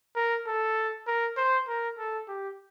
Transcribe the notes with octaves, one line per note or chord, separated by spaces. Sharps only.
A#4
A4
A#4
C5
A#4
A4
G4